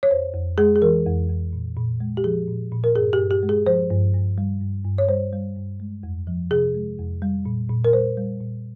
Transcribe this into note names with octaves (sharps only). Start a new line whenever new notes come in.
C#5
F2 C5
F2
G#3 G#4
G#4
E3 A#4
F2
F2
A#2
A#2
G#3
G4
F3 G#4
A#2
A#2
A#4
G2 G#4
G4
G2
G4
G#3
G#4
F3 C5
G2
G2
G3
G2
G2
C#5
G3 C5
G3
G2
G#3
F2
F3
C3 G#4
G#3
F2
G3
A#2
A#2
A#4
G3 C5
G3
A#2